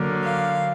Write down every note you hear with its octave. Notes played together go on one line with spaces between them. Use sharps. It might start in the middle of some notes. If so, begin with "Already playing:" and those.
Already playing: D3 F#3 A#3
F5